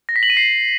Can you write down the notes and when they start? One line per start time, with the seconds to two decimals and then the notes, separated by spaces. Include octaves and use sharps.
0.09 A#6
0.16 B6
0.23 F#7
0.30 D#7
0.37 C7